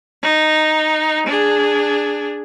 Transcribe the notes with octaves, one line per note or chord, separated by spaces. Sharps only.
D#4
D4 G#4